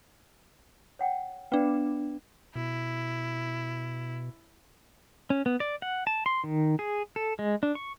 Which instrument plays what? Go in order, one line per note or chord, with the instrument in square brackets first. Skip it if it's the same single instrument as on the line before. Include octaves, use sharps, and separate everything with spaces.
[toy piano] C#5 F#5 G5
[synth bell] B3 D4 [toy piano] B4 F5 G5
[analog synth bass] B2 [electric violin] E4
[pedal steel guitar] C#4
B3
D5
F#5
A5
C6
D#3
G#4
A4
G#3
D4
C#6